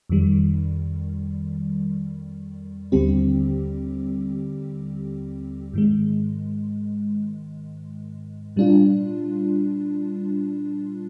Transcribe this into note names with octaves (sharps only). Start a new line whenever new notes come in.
F2 D#3 G3
D#2 D3 G3 C4 G4
G#2 D#3 G#3
A#2 G3 D4 F4